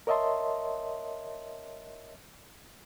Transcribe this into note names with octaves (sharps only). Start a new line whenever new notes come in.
A#4 C#5 D#5 E5 A5 C6